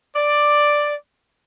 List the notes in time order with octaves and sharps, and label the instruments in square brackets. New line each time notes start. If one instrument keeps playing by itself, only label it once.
[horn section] D5